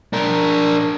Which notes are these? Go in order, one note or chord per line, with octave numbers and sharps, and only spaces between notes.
D4 A#4